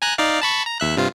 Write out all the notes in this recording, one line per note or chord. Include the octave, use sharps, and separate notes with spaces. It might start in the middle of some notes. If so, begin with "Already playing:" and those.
G#5 A#5 F#6
D#4 D5 F5
A5 B5 C#6
A#5
D#2 E5 F#6
G2 C3 F4